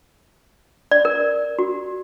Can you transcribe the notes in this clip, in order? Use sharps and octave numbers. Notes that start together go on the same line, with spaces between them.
D5
A#4
F#4